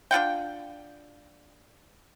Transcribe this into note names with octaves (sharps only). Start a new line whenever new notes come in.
D4 F4 F#5 G5